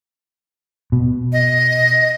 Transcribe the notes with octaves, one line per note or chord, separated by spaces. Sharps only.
B2
D#5